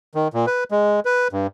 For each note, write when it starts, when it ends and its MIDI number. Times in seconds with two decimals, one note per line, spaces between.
0.15 0.28 51
0.34 0.46 46
0.47 0.64 71
0.71 1.00 56
1.05 1.28 71
1.32 1.47 43